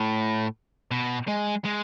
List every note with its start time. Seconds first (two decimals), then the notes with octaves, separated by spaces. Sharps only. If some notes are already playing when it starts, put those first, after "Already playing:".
Already playing: A2
0.91 B2
1.28 G#3
1.65 G#3